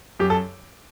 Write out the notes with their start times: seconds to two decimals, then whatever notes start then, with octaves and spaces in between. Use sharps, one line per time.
0.20 F#2 G4
0.30 A4